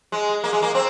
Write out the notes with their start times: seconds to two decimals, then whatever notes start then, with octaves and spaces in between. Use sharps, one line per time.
0.12 G#3
0.44 A#3
0.53 G#3
0.62 A#3
0.75 C4